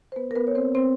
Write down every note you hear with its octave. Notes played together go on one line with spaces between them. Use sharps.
C5
B3 B4
A#4
B3 B4
C#5
C4 C5
C4 C5